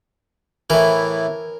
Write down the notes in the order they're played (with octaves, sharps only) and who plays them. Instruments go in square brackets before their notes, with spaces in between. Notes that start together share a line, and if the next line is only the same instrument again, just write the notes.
[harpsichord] A2 E3 A#4